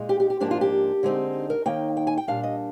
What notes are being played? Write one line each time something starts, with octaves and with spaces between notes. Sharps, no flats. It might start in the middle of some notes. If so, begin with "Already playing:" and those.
Already playing: A#2 G#3 D#4
G4
G4
G4
G#2 F3 A#3 D4 G4
F4
G4
D3 G#3 C4 D#4
A#4
D#2 D#3 A#3 D#4 G5
G5
G#5
G5
A#2 G3 D4 F5
D#5